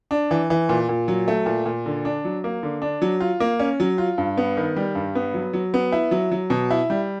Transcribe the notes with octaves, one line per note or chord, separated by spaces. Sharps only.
D4
E3
E3
A#2
A#2
F#3
A3
A#2
A#2
D3
D4
F#3
A#3
D3
D4
F#3
F4
A#3
C#4
F#3
F4
G2
B3
D#3
G3
G2
B3
F#3
F#3
B3
E4
F#3
F#3
B2
E4
G3